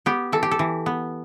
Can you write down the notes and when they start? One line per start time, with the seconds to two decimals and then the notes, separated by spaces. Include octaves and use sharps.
0.06 B3 G4
0.32 E3 A4
0.43 G4
0.51 A4
0.59 E3
0.86 B3